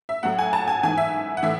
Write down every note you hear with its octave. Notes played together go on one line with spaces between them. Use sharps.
E5
A2 F#3 F#5
G#5
A5
G#5
G#2 E3 G#5
E5
F#5
A2 E3 E5